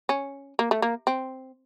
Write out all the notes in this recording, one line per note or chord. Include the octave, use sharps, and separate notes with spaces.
C#4
A#3
A3
A#3
C4